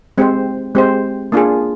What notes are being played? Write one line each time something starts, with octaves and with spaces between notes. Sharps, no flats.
G#3 C4 G4 C5
G#3 C4 G4 C5
A#3 D4 F4 G#4